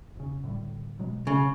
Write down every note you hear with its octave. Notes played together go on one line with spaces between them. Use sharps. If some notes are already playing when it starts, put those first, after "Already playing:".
E1 C#3
A2 D3 G3
B2 F#3 G#3
C#3